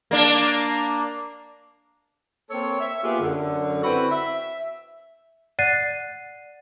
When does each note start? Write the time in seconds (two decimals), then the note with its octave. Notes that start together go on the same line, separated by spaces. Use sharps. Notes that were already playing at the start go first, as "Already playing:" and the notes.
0.11 A#3 D4
2.50 A#3 C4 A4 C#5
2.80 E5
3.04 A#3 B3 F4 G4 G#4
3.21 F#2 D3
3.84 C4 E4 F#4 B4
4.11 E5
5.59 D5 F#5 F#6 A6 C7 D#7